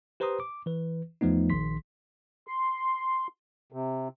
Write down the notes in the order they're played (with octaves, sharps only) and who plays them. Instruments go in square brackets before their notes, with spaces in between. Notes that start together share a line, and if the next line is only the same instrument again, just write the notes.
[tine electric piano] G4 B4 C5 A#5 C6 D#6
D6
E3 B4
E2 F3 A3 B3 D#4
A#1 D#3 C6 B6
[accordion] C6
C3